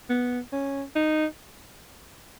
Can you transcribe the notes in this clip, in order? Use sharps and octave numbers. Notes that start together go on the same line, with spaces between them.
B3
C#4
D#4